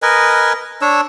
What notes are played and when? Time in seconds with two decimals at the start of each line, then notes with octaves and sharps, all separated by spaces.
0.02 A#4 B4 D#5 G#5
0.81 D4 C#5 E6